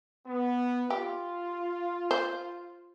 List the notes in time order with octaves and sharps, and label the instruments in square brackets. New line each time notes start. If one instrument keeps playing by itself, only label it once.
[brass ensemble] B3
[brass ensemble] F4 [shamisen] G4
[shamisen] C5